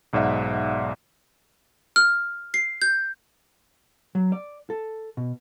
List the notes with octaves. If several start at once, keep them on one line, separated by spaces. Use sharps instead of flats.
B1 G#2 D5 E5 F#5
F6
C7
G6
F#3
D5
A4
B2